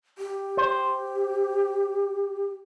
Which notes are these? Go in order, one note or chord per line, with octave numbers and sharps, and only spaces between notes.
G4
C5